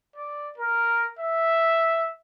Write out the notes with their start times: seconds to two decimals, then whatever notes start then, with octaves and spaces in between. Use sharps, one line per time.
0.16 D5
0.58 A#4
1.19 E5